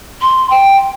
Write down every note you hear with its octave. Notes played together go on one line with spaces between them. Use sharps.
C6
G5